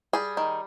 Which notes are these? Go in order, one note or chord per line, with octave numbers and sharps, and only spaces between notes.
G3 G#4
D#3